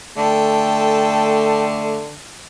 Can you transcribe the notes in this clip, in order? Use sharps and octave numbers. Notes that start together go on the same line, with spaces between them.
D3 A3 G5 A5